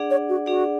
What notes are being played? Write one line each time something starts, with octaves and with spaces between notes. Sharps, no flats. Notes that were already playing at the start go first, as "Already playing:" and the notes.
Already playing: D4 G#4 D5 F#5
C#5
F#4
D4 F#4 G#4 D5 F#5